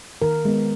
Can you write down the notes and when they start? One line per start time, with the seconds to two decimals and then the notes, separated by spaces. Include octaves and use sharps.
0.22 D#3 A#4
0.45 G#3 B3